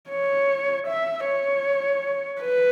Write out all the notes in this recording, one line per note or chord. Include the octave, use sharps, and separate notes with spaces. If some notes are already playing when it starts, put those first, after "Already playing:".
C#5
E5
C#5
B4